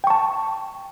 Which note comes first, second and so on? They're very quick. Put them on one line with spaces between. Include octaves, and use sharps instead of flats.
G5 C#6 A5